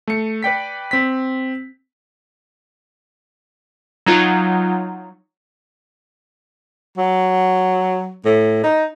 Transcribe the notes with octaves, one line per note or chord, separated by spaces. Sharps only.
A3 C#7
B4 D5 G5 B6
C4 B6
F#3 D#4 F4
F#3
A2
D#4